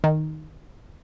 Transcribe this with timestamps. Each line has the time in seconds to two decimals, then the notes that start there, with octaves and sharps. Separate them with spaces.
0.04 D#3